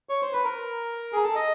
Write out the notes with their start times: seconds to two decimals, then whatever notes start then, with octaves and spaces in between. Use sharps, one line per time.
0.09 C#5
0.22 C5
0.33 B4
0.44 A#4
1.13 G#4
1.24 A4
1.35 D#5